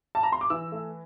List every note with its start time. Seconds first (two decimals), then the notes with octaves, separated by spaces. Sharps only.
0.15 A5
0.23 A#5
0.32 C6
0.41 D6
0.50 E3 E6
0.72 A3